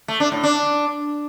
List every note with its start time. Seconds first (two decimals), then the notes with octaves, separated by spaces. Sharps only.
0.08 A3
0.20 D4
0.32 A2
0.43 D4